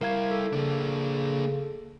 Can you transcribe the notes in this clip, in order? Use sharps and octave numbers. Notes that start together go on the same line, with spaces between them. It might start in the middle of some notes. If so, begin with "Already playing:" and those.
G3 E4 A#4 F5 G#6
A4
C#3 A#3 D4